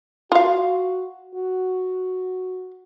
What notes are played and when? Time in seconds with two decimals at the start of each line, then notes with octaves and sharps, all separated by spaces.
0.32 F4 F#4 F5
1.35 F#4